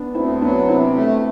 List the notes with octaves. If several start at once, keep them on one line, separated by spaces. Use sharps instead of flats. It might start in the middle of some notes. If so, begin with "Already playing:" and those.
Already playing: B3 D4
D2 C4 E4
F#3 B3 D4
C3 C4 E4
A3